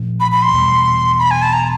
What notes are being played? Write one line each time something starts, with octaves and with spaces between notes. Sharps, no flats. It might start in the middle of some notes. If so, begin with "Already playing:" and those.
Already playing: A#2 F3 A3 C#4
B5
B5
C6
E2 B2 G3
B5
G#5
A5
A#5